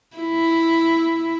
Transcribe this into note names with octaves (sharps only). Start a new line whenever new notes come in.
E4